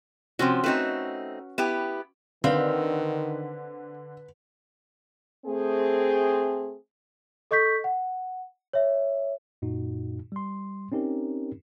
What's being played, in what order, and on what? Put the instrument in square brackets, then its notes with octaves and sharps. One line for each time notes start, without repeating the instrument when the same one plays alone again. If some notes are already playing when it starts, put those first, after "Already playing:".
[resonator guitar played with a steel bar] C3 F3 [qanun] C4 C#4 F#4
[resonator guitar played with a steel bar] A3 C4 D#4 [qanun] F#4 B4
[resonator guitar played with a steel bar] B3 E4 G4
[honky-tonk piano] D3 [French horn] D#3 [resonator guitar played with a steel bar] C4 G4 F5 [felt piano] B4
[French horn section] A3 C4 G#4
[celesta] A4 D#5 C#6 G6 B6
F#5
C#5 E5
[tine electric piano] F#2 A#2 D#4 F#4
G3 C6
C4 C#4 D#4 G4 A#4